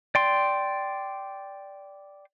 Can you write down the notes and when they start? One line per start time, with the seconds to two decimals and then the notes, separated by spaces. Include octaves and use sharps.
0.15 D5 G5 C6